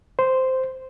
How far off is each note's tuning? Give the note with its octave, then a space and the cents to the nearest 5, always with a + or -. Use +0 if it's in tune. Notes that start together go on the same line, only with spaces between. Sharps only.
C5 -5